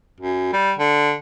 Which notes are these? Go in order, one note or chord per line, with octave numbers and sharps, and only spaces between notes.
F#2
G3
D3